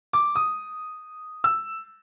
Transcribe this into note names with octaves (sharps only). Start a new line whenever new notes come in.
D6
D#6
E6